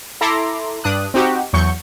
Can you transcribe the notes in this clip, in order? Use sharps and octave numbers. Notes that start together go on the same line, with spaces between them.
E4 A4 E5 A#5 C6 D6
G2 D4 D#6 F#6
C4 D#4 F#4 G4
E2 F#3 C#6 G6 C#7